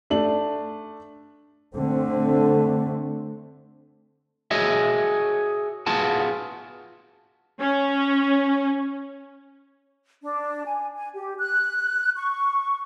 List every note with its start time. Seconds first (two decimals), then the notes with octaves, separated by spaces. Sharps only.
0.10 A3 D4 F#7
1.74 D3 A3 C4
4.51 F#4 G#4 C#5 D#5 E5
5.86 B3 F4 F#4 G#4 A5
7.60 C#4
10.22 D4
10.66 G#5
10.96 G#5
11.15 G4
11.39 F#6
12.16 C#6